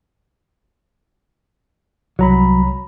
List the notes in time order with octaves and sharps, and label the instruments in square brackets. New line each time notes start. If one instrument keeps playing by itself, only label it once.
[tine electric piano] C2 A#5 B5 [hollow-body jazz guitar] F#3